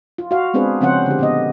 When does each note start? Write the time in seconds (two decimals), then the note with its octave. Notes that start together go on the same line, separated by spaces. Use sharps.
0.18 F4
0.31 F#4 F5
0.54 G#3 B3 C4 D4 G#4 B4
0.81 C#3 F3 C4 C#4 C5 F#5
1.06 D3 G4
1.19 A#2 B3 D#5